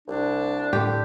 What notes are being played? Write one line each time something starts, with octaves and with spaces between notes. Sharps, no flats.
C2 D4
A2 D3 G4